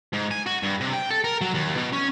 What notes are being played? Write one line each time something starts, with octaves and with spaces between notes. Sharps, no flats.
G#2
G#5
F#4
G2
C3
G5
A4
A#4
F#3
D#2
B2
C#4